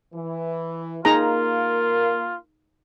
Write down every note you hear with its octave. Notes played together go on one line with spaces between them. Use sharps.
E3
A#3 D#4 F4 G#4 A#4 A#5